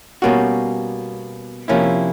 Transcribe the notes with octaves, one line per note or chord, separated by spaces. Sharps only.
B2 G3 A#3 C#4 F#4
C3 F3 A#3 C#4 E4